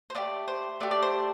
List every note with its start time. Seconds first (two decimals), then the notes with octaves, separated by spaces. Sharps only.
0.10 C5
0.15 A3 D4 G4 D5
0.48 C5
0.80 A3 D4 G4
0.91 D5
1.02 C5